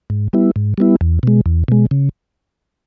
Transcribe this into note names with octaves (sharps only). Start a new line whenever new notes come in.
G#2
G3 B3 E4
G#2
G3 B3 E4
E2
B2 G#3
E2
B2 G#3
C#3